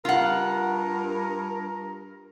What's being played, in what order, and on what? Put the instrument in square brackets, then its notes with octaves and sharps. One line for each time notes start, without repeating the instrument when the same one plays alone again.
[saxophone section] G2 A#4 [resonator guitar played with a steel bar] F4 F#5